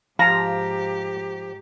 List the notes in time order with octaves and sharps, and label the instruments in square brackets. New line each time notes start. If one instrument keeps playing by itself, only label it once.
[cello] G#2 G4 [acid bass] F3 [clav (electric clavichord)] F5 [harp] A#5